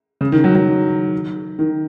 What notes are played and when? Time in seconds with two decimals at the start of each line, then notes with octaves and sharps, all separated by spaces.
0.21 C#3
0.32 D#3
0.44 F#3
0.55 F#3
1.59 D#3